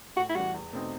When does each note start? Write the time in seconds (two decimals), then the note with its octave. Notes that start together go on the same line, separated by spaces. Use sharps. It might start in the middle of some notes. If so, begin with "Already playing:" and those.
0.16 A2 F#4
0.29 E4
0.35 E3 G3 F#4
0.54 E2
0.73 B2 A3 C4 D#4